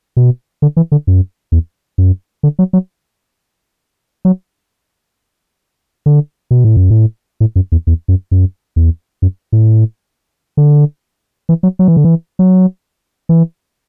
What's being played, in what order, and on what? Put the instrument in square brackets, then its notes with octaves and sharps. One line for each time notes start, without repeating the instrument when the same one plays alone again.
[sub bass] B2
D3
E3
D3
F#2
E2
F#2
D3
F#3
F#3
F#3
D3
B2
A2
F#2
A2
A2
F#2
E2
E2
F#2
F#2
E2
F#2
A2
D3
E3
F#3
F#3
E3
D3
E3
F#3
E3